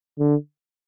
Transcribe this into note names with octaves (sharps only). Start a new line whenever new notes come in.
D3